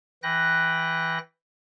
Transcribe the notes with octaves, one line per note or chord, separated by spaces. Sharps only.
E3 B4 G5 F#6 A#6